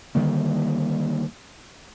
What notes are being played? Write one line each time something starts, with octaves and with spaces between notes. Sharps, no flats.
D3 D#3 G3 A#3